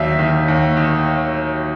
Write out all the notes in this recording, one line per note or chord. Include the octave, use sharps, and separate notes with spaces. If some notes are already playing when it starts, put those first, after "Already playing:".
Already playing: D#2 D#3 F#3 D5 E5 F5
D#3
D#2
D#3